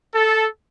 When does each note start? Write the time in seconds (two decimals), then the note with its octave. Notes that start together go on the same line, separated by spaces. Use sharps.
0.14 A4